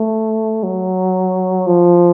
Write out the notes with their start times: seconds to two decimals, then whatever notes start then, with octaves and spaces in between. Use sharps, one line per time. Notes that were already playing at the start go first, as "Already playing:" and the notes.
Already playing: A3
0.63 F#3
1.67 F3